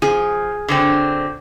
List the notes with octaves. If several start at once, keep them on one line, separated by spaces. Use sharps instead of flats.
F3 G#4
D3 F#3 C4